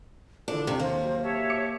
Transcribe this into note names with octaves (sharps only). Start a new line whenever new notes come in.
D3 E3 F3 D4 A4
D#2 C3 D4
A#3 C5
F#3
G4 C#5 E5 A5
D6 C#7